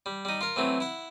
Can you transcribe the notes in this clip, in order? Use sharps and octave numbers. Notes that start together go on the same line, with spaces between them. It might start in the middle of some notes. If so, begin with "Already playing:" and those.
G3
G3 D#4
F4 A#4
E3 F#3 A3 C4
E4 F#5